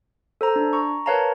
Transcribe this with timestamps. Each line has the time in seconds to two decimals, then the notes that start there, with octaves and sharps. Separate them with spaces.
0.41 A4 C5 A#5
0.56 D4
0.73 A#5 C#6
1.06 A#4 B4 C#5 F5 A5 A#5